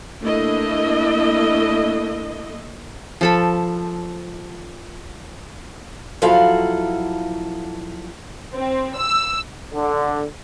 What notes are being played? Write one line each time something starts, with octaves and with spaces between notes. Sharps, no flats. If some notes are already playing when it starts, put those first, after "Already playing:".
A3 A#3 D4 E4 D#5
F3 A4 B5
F3 F#3 E4 A4 F5 F#5
C4
E6
D3